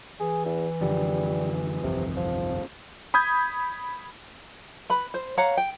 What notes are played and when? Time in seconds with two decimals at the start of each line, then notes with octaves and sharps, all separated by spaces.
0.20 E3 G#4
0.45 E2
0.81 F#2 D3 F3 G3
1.83 G1 C2 F2 C3
2.17 F3
3.14 B5 D#6 G6 G#6
4.90 B4 B5
5.14 C5
5.37 C#5 F5 F#5 A#5
5.57 G5